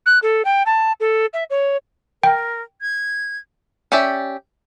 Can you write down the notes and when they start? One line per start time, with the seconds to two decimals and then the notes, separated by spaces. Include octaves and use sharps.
0.06 F#6
0.22 A4
0.45 G5
0.66 A5
1.00 A4
1.34 E5
1.50 C#5
2.23 A#4 G5
2.81 G#6
3.92 C#4 G4 D5 E5